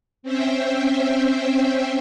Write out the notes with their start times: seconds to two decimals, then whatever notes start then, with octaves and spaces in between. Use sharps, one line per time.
0.23 C4 C#4 C5 E5 G5